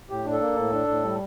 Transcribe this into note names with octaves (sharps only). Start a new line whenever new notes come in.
A2 G4
D4
A4
A#3
A2
D4
A2
G3